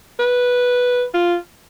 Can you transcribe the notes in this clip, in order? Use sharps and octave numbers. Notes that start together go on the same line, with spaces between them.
B4
F4